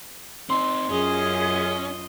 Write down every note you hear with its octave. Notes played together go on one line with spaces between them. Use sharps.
C4 D#4 C6
F#2 C#4 F4 G#4 D#5